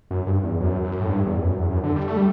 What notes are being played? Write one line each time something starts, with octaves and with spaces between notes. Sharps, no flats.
F#2
G2
E2
F#2
F#2
A2
G2
E2
F#2
E2
F#2
D3
G3
A3
G3